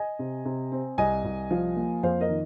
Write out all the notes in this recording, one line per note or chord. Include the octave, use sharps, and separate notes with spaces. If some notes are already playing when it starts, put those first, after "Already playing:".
Already playing: D#5 G#5
C3
C3
C4
C2 D#5 G#5
C2
F3
A#3
F2 C5 F5
A#4 D#5
D#3